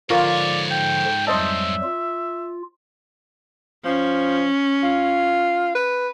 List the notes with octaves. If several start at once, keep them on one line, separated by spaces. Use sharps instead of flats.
G#2 D3 F3 F4 A#4 C#5 D5 C#6
G5
F2 F#3 G3 C5 D#5 E5 A5
F4
F3 C#4
F4
B4